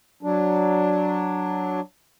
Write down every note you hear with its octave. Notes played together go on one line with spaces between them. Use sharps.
F#3 D4